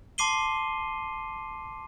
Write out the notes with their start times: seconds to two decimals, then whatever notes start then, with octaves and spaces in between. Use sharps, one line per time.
0.18 A5 C6 D6 C7 D#7 G7